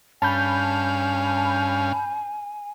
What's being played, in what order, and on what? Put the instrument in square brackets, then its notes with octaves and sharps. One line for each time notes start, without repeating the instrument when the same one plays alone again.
[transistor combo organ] G2 C#4 F5 [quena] G#5 [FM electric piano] A5 B5 G6